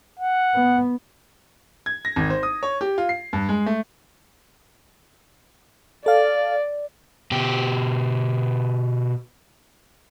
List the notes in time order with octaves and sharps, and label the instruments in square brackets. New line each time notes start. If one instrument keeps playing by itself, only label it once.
[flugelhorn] F#5
[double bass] B3
[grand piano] G#6
A#6
G#1
C5
D#6
C#5
G4
F4
C7
G2
G#3
A3
[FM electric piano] A4 F5 [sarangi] D5
[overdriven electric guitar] B2 G4